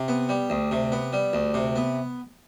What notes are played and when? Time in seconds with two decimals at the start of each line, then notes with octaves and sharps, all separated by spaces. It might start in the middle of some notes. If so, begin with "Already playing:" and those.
Already playing: C3
0.08 B3
0.29 G3
0.50 D2
0.71 C3
0.92 B3
1.13 G3
1.33 D2
1.54 C3
1.76 B3